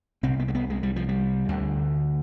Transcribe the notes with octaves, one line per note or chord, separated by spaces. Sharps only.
C2 C3 C4
B3
G#3
B3
G#3
G3
F3
G3
D2 D3